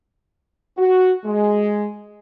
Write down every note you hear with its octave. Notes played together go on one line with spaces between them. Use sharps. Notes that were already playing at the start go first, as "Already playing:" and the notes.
F#4
G#3